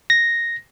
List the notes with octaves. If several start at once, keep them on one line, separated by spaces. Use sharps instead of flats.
A#6